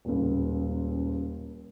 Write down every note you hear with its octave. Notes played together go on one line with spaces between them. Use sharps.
D#1 C#2